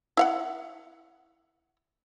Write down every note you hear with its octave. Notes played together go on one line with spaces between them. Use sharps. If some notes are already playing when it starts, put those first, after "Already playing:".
E4 F5 F#5